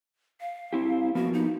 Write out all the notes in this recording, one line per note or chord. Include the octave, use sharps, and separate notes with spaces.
F5
C4 E4 G4
F3 A#3 B3 F#4
D#4